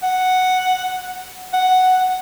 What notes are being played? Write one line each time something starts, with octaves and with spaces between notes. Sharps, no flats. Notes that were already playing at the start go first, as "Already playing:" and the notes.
F#5
F#5